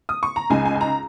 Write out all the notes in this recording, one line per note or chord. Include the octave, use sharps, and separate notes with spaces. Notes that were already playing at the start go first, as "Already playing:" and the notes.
D#6
C#6
A#5
C#2 C#3 G#3 D#4 G#5
G#5
G#5
A#5